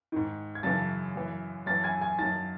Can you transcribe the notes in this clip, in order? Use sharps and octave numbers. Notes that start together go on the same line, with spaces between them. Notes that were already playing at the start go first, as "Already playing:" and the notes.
G#2 D#3
G#6
F#2 C#3 E3 A5 A6
F#2 E3
F#2 E3 A5 A6
G#5 G#6
G#5 G#6
F#2 D#3 A5 A6